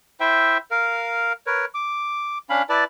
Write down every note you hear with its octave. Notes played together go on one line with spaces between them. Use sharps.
E4 C5 E5 G5
A#4 F5
A#4 B4 C#5
D6
C#4 D4 F5 B5
E4 B4 D5 A5